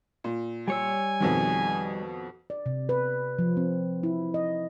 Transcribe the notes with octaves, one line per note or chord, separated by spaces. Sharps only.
A#2
G3 C#5 G#5 E6
F2 B2 D#3
D5
C3
B4
F3
C4
E4
D#5